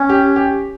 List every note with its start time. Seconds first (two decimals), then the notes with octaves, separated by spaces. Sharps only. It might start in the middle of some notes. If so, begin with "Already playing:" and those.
Already playing: C#4
0.09 G4
0.36 G4